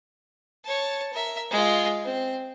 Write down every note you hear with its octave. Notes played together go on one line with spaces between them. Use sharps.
C#5 A5
A#4 E5
G#3 F4
C4